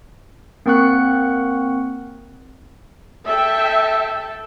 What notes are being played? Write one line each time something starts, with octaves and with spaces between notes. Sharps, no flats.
A#3 C4 A#4 F#5 C#6 F#6
A4 E5 G5